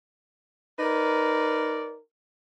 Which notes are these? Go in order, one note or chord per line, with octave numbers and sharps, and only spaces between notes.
D#4 A#4 B4 D5